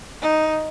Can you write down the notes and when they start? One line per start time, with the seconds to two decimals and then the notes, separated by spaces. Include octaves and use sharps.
0.22 D#4